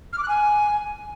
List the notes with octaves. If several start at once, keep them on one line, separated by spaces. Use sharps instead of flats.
F6
D6
F#6
G#5